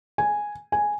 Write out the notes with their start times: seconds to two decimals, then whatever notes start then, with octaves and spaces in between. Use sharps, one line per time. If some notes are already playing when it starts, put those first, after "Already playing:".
0.18 G#5
0.72 G#5